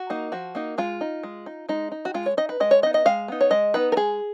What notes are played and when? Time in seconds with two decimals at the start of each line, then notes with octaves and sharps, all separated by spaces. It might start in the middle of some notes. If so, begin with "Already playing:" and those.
Already playing: F#4
0.10 A#3 D#4
0.32 F3 F#4
0.55 A#3 D#4
0.78 G#3 F4
1.01 D#4
1.23 G#3
1.46 D#4
1.69 G#3 D#4
1.92 D#4
2.05 F#4
2.14 G#3 F4
2.26 C#5
2.37 D#4 D#5
2.49 B4
2.60 G#3 D#5
2.71 C#5
2.82 B3 D#5
2.86 D#4
2.94 D#5
3.06 G#3 F5
3.28 B3 D#4
3.41 C#5
3.51 G#3 D#5
3.74 B3 D#4 B4
3.92 A#4
3.96 G#3 G#4